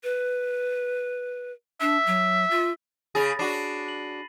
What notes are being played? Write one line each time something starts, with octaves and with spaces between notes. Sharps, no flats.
B4
D4 E5
F#3
F4
C#3 G#4 B5 A6 A#6
D4 F#4 B5 C7 D#7
F#7